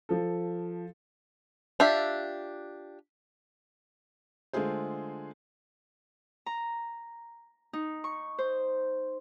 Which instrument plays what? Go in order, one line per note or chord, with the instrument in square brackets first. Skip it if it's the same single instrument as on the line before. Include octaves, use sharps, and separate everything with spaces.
[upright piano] F3 A4
[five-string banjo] D4 F4 G4 E5
[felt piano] D3 G#3 A3 F4 G#4 C5
[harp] A#5
D#4
C#6
C5